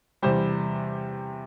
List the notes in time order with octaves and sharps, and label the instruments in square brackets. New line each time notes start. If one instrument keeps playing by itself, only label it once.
[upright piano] E2 C3 G3 G4 C5